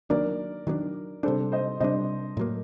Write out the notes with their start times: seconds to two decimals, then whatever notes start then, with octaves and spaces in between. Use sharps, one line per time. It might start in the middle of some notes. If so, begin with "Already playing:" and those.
0.10 D#3 F#3 A#3 D4 A#4 D5
0.67 D#3 F#3 A#3 D4
1.23 C3 G3 D4 A4 C5
1.52 C5 D#5
1.80 C3 G3 D4 C5 D#5
2.37 A2 F#3 A#3